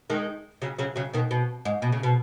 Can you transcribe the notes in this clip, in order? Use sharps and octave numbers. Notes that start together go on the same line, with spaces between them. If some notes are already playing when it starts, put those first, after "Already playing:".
D#3 G#3
C#3 F#3
C#3 F#3
C#3 F#3
B2 D#3
B2
G#2
B2
C#3
B2